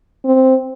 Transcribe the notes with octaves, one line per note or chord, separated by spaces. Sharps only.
C4